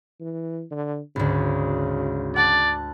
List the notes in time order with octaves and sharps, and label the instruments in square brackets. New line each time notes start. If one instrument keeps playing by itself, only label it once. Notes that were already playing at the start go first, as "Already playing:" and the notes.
[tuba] E3
D3
[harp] G#1 D2 [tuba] C#3
[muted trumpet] D5 [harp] F#5 A5